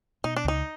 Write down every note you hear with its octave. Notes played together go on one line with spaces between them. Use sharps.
B2 D#4
D4
C#2 D#4